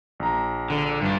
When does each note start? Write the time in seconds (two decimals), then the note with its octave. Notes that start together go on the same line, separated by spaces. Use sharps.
0.20 A#1 A#5
0.70 D3
1.02 G2 D4